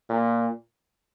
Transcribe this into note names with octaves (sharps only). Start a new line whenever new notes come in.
A#2